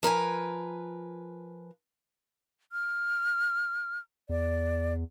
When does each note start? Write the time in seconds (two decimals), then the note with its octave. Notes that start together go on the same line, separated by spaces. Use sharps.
0.03 F3 A#4 B4 G#5
2.72 F6
4.29 E2 D5